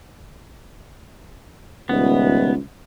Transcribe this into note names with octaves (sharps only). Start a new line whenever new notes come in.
D#1 C#2 B3